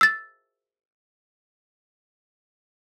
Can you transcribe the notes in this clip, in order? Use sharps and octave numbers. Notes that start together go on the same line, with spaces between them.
E6 A6